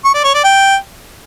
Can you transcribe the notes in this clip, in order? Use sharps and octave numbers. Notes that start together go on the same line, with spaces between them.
C#6
D5
C#5
D5
G5